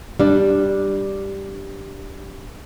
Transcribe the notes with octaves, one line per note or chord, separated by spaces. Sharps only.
G3 D4